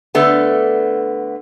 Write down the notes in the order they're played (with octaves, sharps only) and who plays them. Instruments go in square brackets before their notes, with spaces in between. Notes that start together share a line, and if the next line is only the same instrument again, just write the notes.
[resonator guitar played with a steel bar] D3 A3 B3